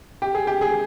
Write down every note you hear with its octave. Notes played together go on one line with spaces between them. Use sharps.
G4
G#4
G4
G#4